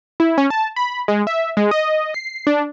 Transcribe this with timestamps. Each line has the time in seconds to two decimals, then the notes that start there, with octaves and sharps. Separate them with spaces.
0.20 E4
0.38 C#4
0.50 A5
0.76 B5
1.08 G#3
1.27 E5
1.57 G#3
1.71 D#5
2.14 C7
2.47 D4